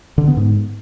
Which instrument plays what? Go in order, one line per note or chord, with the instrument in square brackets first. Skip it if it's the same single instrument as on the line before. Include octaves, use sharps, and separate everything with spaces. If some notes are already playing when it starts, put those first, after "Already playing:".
[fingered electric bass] D3
B3
G#2